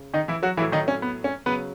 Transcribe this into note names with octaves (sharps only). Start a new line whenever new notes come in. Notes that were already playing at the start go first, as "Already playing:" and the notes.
Already playing: C#3
D#3 D#4
E3 E4
F#3 F#4
A2 E3 F#3 E4
D#3 D#4
C#4
B3
C#4
C#3 F#3 B3 B4